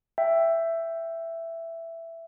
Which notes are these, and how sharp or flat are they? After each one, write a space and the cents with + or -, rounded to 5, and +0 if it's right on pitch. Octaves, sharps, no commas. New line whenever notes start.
E5 +10 G5 +0